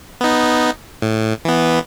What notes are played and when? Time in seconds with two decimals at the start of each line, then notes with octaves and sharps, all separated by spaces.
0.21 B3 D#4
1.02 A2
1.45 E3 B3